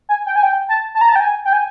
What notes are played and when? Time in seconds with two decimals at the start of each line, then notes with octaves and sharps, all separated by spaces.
0.09 G#5
0.26 G5
0.36 G#5
0.43 G5
0.69 A5
0.95 A5
1.01 A#5
1.09 A5
1.16 G5
1.20 G#5
1.45 G5
1.53 G#5